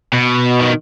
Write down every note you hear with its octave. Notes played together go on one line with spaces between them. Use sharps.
B2
D#3